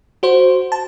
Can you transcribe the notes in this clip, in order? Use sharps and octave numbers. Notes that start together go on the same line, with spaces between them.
F#4 C5
A5